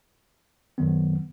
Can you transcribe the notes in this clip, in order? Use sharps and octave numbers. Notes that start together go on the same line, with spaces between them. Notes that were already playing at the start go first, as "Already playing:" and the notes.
F#2 D#3 F#3 B3